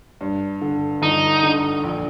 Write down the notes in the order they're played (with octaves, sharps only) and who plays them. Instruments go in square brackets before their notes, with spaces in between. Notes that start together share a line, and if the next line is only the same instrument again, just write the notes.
[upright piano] G2
D3
[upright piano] G1 [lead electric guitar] D#4
[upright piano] D3
A#1